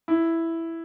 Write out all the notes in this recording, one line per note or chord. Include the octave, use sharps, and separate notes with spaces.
E4